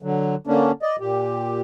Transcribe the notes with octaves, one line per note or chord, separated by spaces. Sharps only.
D3 F#3
D3 A#3 C#4 D4
D5 D#5
A#2 G4